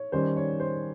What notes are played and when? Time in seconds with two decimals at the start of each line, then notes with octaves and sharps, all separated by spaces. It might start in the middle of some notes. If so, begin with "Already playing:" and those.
Already playing: C#5
0.12 D#3 G3 C#4 C5
0.37 C#5
0.60 C5